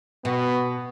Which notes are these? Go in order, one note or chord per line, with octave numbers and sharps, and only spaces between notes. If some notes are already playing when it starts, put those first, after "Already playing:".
B2 B3